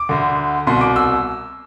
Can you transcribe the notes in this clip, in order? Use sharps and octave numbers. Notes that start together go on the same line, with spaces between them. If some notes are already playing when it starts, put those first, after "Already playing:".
Already playing: D6
D2 D3
C2 B2 C6
D6
E6